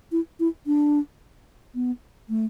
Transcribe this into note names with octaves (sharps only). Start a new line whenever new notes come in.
E4
E4
D4
B3
A3